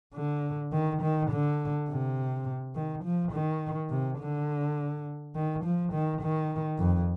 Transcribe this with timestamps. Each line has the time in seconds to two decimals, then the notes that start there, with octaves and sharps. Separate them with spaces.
0.14 D3
0.72 D#3
1.02 D#3
1.31 D3
1.89 C3
2.75 D#3
3.05 F3
3.33 D#3
3.90 C3
4.20 D3
5.36 D#3
5.65 F3
5.93 D#3
6.22 D#3
6.79 F2